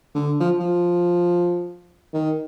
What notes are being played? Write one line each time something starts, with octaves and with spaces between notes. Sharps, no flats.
D3
F3
F3
D#3